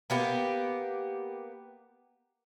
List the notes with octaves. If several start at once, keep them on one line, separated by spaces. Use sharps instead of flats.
A#3 B3 G4